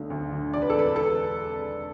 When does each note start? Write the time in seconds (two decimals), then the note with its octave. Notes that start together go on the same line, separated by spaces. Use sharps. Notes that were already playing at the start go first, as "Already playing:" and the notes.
Already playing: B1 D3 A3
0.10 D2
0.32 D3
0.53 E1 D5
0.62 B4
0.70 A4
0.75 E1 B4
0.96 A4